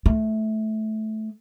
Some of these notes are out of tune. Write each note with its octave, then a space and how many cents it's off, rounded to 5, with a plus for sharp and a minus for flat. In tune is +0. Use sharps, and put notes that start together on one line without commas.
A3 -15